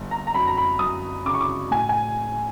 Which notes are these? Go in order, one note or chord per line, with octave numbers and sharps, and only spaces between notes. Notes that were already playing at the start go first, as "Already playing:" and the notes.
Already playing: G1
A#5
A#5
F#2 B5
A#5
B5
F#2 D#6
C#3 D6
C#6
D6
A2 G#5
G#5